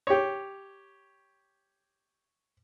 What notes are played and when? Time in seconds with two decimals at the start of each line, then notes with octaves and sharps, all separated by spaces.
0.07 G4 C#5